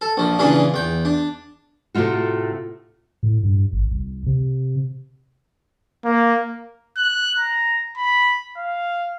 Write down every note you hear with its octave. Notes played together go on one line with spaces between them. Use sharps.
A4
A#1 F3
A#2 C#3 E3 D4 G#4
E2 G5
D4
A2 C3 A3 F4 F#4
A2
G2
G#1
C2
C3
A#3
F#6
A#5
B5
F5